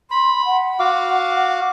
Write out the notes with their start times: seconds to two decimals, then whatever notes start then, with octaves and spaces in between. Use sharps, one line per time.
0.11 B5 C6
0.46 F#5
0.80 F#4 F5 D6